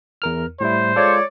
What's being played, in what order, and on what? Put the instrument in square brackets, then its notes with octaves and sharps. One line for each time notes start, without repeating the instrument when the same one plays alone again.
[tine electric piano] E2 A#4 F6
[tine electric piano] A2 G3 E4 [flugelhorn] C5
[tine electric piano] G#3 F4 A4 [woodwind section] C#5 D5